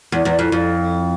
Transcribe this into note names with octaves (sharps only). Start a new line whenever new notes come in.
E2
E2
F2
F2